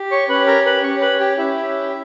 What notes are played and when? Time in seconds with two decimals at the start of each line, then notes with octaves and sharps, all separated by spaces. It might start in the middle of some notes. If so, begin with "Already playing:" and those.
Already playing: G4
0.11 C#5 C#6
0.29 C#4 G4 B4 B5
0.47 A#4 A#5
0.66 B4 B5
0.83 C#4 G4 C#5 C#6
1.01 B4 B5
1.19 G4 G5
1.38 C#4 E4 G4 E5